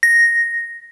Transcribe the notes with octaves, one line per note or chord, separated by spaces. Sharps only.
A#6